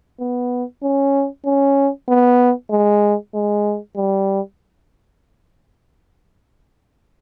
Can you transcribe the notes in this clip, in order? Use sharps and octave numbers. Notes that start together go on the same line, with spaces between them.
B3
C#4
C#4
B3
G#3
G#3
G3